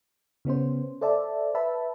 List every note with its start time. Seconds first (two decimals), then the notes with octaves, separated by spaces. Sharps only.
0.45 C#3 B3 C#4 C5
1.01 A4 C5 D5 E5 A5
1.55 B4 E5 A5 B5